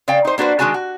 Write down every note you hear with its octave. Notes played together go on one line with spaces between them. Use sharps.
C#3 D5 F5 G5
D#4 C5
A#3 D4 F#4 B4 C5
D#3 G#3 D4 F#4 G#5 A5
F#4